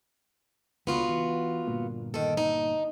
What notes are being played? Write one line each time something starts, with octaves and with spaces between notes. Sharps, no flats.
C#2 D3 B3 F4 F#4
E3
G1 A#2 A#3
D#3 A4
D#4